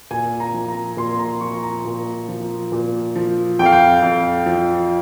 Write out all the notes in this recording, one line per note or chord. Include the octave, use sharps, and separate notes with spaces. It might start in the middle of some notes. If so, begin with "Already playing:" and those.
A#2 G#5
A#5
F3
A#5
A#2 C6
A#5
F3 C#6
A#5
A#2
F3
A#2
F3
F2 G5
F5
G5
F2
F3